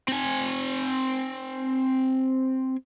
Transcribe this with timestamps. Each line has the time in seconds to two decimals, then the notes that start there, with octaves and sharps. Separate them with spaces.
0.08 C4 G#5